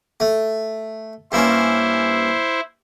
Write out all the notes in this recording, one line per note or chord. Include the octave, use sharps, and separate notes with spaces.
A3
G2 A#3 C#4 E4 C5